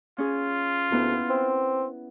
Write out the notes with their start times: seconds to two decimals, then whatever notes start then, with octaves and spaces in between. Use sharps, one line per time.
0.18 C#4 F4 G#4
0.92 D2 B3 E4
1.30 C4